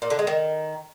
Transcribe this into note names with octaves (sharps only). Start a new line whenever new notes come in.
A#2
D3
G#3
D#3